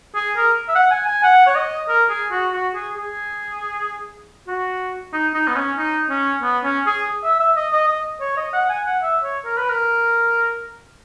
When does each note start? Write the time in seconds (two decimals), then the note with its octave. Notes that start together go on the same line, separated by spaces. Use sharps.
0.15 G#4
0.37 A#4
0.69 E5
0.75 F#5
0.91 G#5
1.07 G#5
1.23 F#5
1.47 C#5
1.56 D#5
1.89 A#4
2.10 G#4
2.31 F#4
2.53 F#4
2.74 G#4
2.97 G#4
4.48 F#4
5.13 D#4
5.34 D#4
5.48 B3
5.56 C#4
5.78 D#4
6.10 C#4
6.43 B3
6.64 C#4
6.86 G#4
7.24 E5
7.40 E5
7.56 D#5
7.73 D#5
7.88 D#5
8.21 C#5
8.37 D#5
8.53 F#5
8.69 G#5
8.86 F#5
9.02 E5
9.24 C#5
9.45 A#4
9.57 B4
9.70 A#4